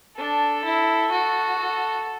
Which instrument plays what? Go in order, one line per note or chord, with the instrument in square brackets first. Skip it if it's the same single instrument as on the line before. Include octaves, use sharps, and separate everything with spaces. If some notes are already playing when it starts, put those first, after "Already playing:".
[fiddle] D4 [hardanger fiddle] A4
[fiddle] E4
F#4
[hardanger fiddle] A4